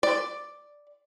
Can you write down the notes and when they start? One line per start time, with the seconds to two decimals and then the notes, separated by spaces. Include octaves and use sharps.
0.03 D5